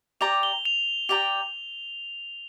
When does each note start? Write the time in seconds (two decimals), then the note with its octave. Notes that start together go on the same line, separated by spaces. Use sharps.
0.21 G4 D5 G5 A#5 F7
0.43 G7
0.65 F7
1.09 G4 D5 G5 A#5 F7